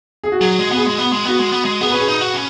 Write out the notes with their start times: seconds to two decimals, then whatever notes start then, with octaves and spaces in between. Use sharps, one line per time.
0.24 G#4
0.32 F#4
0.40 F#3 G#4
0.59 G#3
0.72 B3 G#4
0.86 G#3
0.98 B3
1.12 G#3
1.25 B3 F#4
1.39 G#3
1.52 B3
1.65 G#3
1.81 B3 G#4
1.90 B4
1.94 C#4 G#4
2.08 D#4
2.21 F#4
2.34 C#4